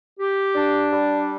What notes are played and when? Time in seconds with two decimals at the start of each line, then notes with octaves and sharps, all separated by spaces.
0.19 G4
0.54 D4
0.92 G3